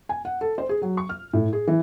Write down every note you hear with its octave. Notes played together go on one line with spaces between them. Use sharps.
G#5
F#5
A4
C5
G#4
F#3
C#6
F6
A2
G#4
E3